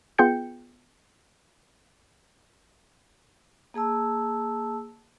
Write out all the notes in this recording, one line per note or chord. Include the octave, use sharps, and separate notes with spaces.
B3 F4 G#4 G5 G6 C#7
A#3 G#4 A5 E6